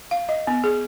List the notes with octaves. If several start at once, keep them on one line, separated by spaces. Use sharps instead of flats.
F5
D#5
B3
G#4